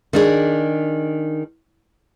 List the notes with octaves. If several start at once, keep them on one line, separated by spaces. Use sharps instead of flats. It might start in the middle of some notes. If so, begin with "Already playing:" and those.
D#3 D4 G#4